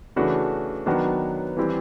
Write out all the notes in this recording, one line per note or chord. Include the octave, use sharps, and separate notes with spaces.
C#3 E3 A3 D4 F#4
D#3 F#3 B3 D4 F#4
E3 G3 C4 E4 G4